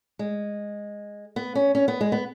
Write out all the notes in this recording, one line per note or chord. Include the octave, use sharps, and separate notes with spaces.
G#3
B3
C#4
C#4
B3
G#3
B3